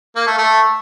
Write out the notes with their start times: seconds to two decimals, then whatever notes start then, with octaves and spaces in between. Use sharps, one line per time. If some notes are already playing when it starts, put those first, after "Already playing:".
0.16 A#3
0.27 A3
0.38 A3